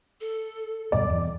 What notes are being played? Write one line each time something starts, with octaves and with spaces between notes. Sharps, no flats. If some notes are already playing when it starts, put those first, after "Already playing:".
A4
D1 G2 B2 D5
E2